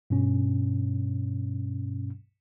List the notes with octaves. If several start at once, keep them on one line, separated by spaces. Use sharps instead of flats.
G2 B2 C#4